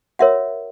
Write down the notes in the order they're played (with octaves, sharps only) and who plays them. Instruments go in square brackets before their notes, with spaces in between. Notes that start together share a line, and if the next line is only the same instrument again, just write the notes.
[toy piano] F#4 A#4 C#5 E5 F#5